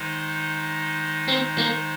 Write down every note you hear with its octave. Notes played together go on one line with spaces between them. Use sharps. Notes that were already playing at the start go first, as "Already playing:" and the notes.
Already playing: D#3 G#3 D#4 C5
C4
A#3